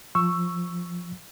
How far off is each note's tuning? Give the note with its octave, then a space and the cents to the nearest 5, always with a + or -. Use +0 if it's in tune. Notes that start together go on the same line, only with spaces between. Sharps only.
F3 +0 C#6 +0 E6 +10